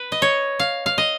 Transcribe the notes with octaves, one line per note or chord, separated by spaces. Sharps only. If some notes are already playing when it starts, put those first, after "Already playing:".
Already playing: B4
D#5
C#5
F5
F5
D#5